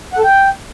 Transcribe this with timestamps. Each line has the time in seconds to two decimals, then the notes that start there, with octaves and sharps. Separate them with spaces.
0.13 F#5
0.18 A4
0.24 G5